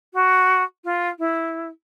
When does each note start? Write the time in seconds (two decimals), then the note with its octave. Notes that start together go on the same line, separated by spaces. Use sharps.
0.14 F#4
0.84 F4
1.19 E4